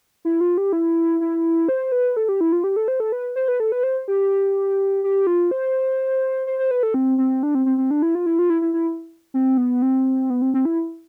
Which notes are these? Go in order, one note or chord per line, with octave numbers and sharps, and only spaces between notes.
E4
F4
G4
E4
E4
C5
B4
A4
G4
E4
F4
G4
A4
C5
A4
B4
C5
B4
A4
B4
C5
G4
G4
F4
C5
C5
C5
B4
A4
C4
C4
D4
C4
C4
C4
D4
E4
F4
E4
F4
E4
E4
E4
C4
B3
C4
B3
C4
C4
E4